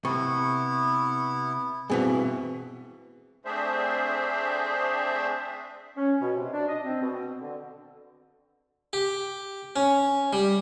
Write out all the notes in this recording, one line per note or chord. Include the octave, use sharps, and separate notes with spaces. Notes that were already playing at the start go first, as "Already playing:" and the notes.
C3 B3 E4 C#6
G2 B2 E3 C4 G#4
A3 C4 D4 G#4 C5 E5
C#4
B2
C3
D4
D#5
C4
B2
D3
G4
C#4
G3